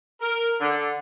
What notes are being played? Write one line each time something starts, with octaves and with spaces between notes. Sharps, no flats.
A#4
D3